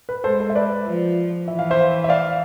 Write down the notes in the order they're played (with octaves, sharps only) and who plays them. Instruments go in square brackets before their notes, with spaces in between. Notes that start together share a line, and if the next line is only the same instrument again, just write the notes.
[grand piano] B4
[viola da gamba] G#3 [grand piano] A4 C5
[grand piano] A4 C5
E5
B4 D5
[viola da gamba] F3
[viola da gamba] E3 [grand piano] E5
[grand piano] F5
C5 E5
E5
D5 F5